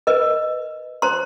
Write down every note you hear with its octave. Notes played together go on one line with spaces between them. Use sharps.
A#4 B4 D#5
C5 A#5 C6